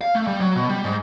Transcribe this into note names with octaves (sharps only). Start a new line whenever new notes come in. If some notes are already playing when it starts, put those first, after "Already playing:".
F5
A3
G3
F#3
B2
G3
G#2